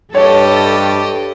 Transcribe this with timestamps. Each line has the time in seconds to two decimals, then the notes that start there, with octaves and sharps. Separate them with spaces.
0.15 G2 G4 A4 C#5 D#5